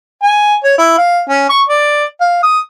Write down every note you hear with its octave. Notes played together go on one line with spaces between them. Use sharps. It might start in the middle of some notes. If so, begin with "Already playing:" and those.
G#5
C#5
E4
F5
C#4
C#6
D5
F5
D#6